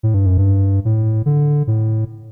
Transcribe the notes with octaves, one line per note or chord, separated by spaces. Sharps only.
A2
G2
F#2
G2
A2
D3
A2